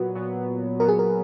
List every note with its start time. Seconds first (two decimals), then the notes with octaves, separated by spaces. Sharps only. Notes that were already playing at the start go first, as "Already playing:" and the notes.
Already playing: A#2 F#3 B3 F#4
0.15 A#2 F#3 B3
0.80 A#2 F#3 B3 A#4
0.89 G#4
0.99 A#4